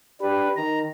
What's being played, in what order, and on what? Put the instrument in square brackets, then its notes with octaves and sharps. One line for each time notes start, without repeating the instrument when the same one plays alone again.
[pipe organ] D4 B4 [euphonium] G4
[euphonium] D#3 [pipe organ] A#5